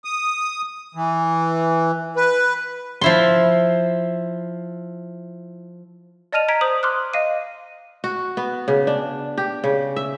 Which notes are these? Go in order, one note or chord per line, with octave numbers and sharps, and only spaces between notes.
D#6
E3
B4
F3 E4 C6
D5 D#5 A5 F6 D#7 F7
A#5 G#6 B6 D7
C5 D#6 F#7
C6 D6 D#6 F6 F#6
D#5 F5 D#7
F#4
B3
C#3
D4
G4
C#3
E5